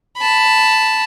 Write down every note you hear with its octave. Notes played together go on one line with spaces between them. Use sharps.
A5 B5